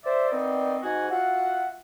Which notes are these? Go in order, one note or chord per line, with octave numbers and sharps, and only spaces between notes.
C5 D5 E5
D#3 B3 C4 D#4 D5
G#2 F#4 G#5
F4 F#4 E5 F#5